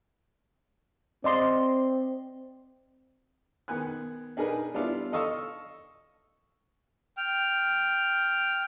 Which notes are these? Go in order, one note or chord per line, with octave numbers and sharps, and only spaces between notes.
C4 D5 D#5 C6
D#3 B3 G#5 F#6
D4 D#4 G#4 A#4 B4
G3 B3 D4 E4 F4
A4 D#5 F5 C#6 E6
G5 F6